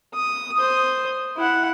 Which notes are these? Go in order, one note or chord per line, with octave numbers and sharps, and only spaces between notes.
D#6
C5 D#6
E4 F#5